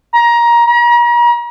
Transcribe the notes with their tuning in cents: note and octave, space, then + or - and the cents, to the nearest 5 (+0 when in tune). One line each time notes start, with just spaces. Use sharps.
A#5 +20
A#5 +40